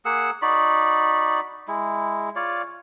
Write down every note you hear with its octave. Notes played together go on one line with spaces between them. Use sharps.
A#3 G#4 F#5 E6
D#4 F#4 D5 B5
G#3 E4
F4 C#5 D5